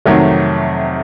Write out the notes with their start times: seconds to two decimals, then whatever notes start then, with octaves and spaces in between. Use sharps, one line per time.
0.06 F2 C3 D#3 F#3 A3